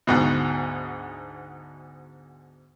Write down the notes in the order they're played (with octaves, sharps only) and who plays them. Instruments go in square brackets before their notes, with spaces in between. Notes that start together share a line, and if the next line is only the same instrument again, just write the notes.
[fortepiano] D2 G#2 B2